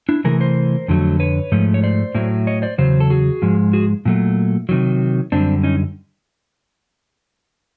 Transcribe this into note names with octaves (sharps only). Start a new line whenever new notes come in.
D4 E4
C3 E3 A3 G#4 A#4
A#4 C5
F2 D3 F#3 A3
B4 C#5
G#2 F3 A3
C#5
C5 D5
A2 F#3 A3
C#5 D#5
C5 D5
E2 C#3 F#3 C5
A4
F#4 G#4
G#2 F3 G#3
F#4 G#4
A#2 F#3 A3
C3 D#3 F#3
F#2 D3 G3 C4 D4
C#4 D#4